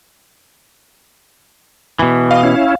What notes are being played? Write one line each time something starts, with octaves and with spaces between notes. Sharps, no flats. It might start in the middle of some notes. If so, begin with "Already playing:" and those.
B2 E3
D#5 F5
C#4 E4